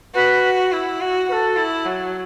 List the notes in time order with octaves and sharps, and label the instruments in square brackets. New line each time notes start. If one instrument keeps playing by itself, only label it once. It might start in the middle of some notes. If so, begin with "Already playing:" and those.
[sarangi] F#4 [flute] B4
[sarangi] E4
F#4
[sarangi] F#4 [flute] A4 B4
[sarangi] E4
F#3